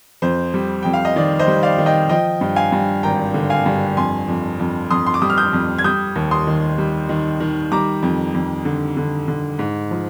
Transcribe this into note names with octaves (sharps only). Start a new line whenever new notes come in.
F2 C5
G3
F2 G5
F5
D#5
D#3 D5
C5 D#5
G3
D5 F5
D#3
D#5 G5
F3 D#5 G5
G2
F5 G#5
G2
G#1 G5 A#5
D3
F5 G#5
G2
F2 G#5 C6
F2
F2
F2 C6 D#6
C6
D6
G3 D#6
F6
D#6 G6
F2
G#6
G3 D#6 G6
D#2
C6 D#6
D#3
G3
D#3
D#3
G3 A#5 D6
F2
F2
D3
D3
D3
G#2
F3